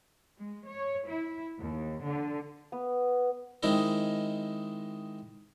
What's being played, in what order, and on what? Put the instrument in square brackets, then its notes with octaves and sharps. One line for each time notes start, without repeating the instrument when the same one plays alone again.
[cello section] G#3
C#5
E4
D#2
D3
[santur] B3
[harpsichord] D#3 G#3 C4 D#4 E4 A#4